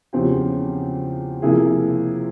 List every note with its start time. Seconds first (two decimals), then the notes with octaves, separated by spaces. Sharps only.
0.13 E2 C#3 F3 C4 G4
1.42 C3 F3 A#3 E4 G#4